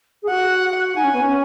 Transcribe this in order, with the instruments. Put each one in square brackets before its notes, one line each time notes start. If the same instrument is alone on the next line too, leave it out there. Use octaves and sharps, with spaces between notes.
[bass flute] G#4
[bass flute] F#4 [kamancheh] F#5
[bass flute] D#4 [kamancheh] G#5
[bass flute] C#4
B3
C#4